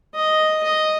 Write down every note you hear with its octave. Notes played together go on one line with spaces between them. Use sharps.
D#5
D#5